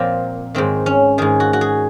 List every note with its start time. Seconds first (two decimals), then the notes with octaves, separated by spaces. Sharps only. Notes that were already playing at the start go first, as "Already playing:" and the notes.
Already playing: A#2 F3 C4
0.55 G#2 D#3 C4
0.86 C#4
1.18 G#2 D#3 G#4
1.40 F#4
1.53 F#4
1.61 G#4